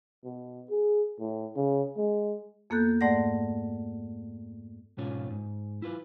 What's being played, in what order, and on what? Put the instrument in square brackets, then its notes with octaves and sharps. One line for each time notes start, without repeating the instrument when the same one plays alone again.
[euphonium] B2
G#4
A2
C#3
G#3
[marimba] F2 A#3 B3 A4 F#6 G6
G#2 A3 D5 F#5 A#6
[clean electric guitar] G#2 B2 C#4 F4 C#5
G#2
E4 F4 B4